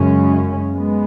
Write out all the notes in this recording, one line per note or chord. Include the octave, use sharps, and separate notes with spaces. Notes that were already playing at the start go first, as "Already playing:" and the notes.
Already playing: F#2 C#3 G#3 C#4
G#3 B3